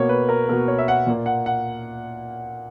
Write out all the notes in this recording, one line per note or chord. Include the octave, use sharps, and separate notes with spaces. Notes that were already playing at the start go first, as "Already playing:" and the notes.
Already playing: B2 A#3 C#5
B4
A#4
B2 A#3 A#4
C#5
E5
F#5
A#2 A#3
F#5
F#5